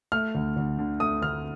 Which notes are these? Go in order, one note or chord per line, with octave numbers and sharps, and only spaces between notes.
A3 F6
D2
D2
D3
A3 D#6
D2 F6